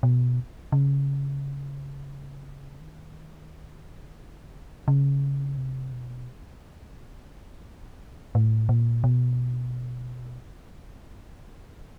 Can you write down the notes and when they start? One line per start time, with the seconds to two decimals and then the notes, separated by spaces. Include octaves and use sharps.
0.03 B2
0.72 C#3
2.80 D#3
4.19 D3
4.88 C#3
5.57 C3
5.92 B2
8.35 A2
8.69 A#2
9.04 B2